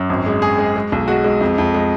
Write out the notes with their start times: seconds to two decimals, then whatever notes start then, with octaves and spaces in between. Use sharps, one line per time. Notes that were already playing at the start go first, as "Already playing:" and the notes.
Already playing: F#2
0.10 G#1
0.26 G#3
0.42 G#3 G#4
0.58 G#3
0.76 G#3
0.92 B1
1.08 G#3 F#4
1.24 G#3
1.41 F2
1.58 F2
1.74 G#3